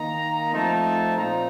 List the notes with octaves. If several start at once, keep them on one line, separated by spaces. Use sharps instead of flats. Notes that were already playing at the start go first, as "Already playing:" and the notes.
Already playing: D#3 A#3 D#4 A#5
F3 A3 C4 D#4 A5
A#2 F3 C4 D#4 A#5